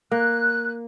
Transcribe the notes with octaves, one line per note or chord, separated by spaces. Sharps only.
A#3 F#6